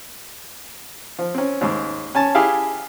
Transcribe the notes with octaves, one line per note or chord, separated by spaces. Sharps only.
F3
C4 C#4
D#2 G#2
C#4 G#5 A5
E4 G4 G#4 E5 F5